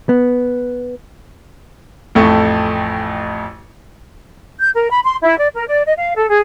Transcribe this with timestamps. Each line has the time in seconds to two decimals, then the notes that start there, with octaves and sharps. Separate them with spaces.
0.09 B3
2.15 A1 F2 A3 C#6
4.60 G6
4.74 A#4
4.90 B5
5.03 C6
5.22 E4
5.38 D5
5.54 A#4
5.67 D5
5.84 D#5
5.97 F5
6.16 A4
6.29 G#4